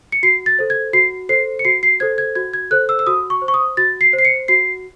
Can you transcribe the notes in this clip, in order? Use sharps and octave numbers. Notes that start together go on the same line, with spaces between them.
C#7
F#4 C7
A6
A4 C5
G#6
F#4 C7
A4 C5 C7
C#7
F#4 C7
C7
A4 C5 G#6
G#6
F#4 G#6
G#6
A4 C5 F#6
E6
E6
F#4 D#6
C#6
C5
C#6
D#6
F#4 A6
C7
C5
C7
C#7
F#4 C7